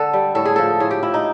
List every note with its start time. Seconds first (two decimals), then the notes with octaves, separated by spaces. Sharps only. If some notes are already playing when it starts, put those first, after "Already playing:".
Already playing: D3 A4
0.13 G3
0.35 A2 A4
0.45 G#4
0.56 F3 A4
0.80 A2 G#4
0.91 G4
1.03 F3 E4
1.14 D#4